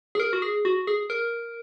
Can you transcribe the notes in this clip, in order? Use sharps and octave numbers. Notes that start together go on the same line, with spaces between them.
G#4
A#4
F#4
G#4
F#4
G#4
A#4